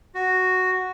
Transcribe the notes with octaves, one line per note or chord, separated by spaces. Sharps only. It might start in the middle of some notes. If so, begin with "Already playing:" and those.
F#4